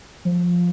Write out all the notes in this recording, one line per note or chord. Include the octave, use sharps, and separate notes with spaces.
F3